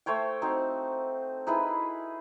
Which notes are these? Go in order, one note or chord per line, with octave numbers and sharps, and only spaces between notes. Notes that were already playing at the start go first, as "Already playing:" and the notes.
A3 C5 C#5 G5
C4 D#4 F#4
D#4 E4 G#4 B4